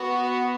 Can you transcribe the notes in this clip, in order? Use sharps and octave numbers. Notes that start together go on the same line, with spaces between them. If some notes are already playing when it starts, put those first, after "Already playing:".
Already playing: B3 F#4